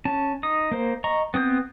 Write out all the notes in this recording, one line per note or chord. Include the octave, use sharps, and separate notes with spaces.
C#4 A5
D#4 D#6
A#3 C5
D#5 A#5 C#6
B3 C4 D#6 G6